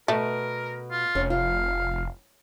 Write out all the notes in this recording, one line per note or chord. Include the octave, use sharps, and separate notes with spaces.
B2 A3 A#4
F4
F1 C#4
F4 F5